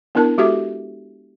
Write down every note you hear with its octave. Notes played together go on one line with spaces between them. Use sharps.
B3 D4 E4 A#4 A5
G#3 F#4 G4 A4 E5 D6